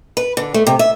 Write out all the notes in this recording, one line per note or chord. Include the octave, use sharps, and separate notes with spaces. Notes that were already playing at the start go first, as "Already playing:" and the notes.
B4
D3
A3
C3
E5